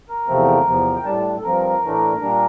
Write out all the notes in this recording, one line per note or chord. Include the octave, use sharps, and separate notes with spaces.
A#4
E2 C3 F3 A3 C4
E2 C3 F3
G5
A2 G3 D4 A5
A5
A4
G2 F3 C4 A#4
A2 E3 A3 D4
A#2 G3 D4